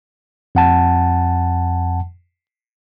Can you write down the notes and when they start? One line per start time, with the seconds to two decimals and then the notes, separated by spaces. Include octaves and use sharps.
0.55 F2 F#5 A5